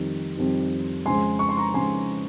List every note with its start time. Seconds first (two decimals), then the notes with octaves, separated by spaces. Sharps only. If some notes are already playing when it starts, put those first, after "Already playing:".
Already playing: F2 D#3 G3
0.37 F2 D#3 G3
1.06 F2 C#3 G#3 C4 G#5 C6
1.39 C#6
1.49 C6
1.57 A#5 C#6
1.74 F2 C#3 G#3 C4 G#5 C6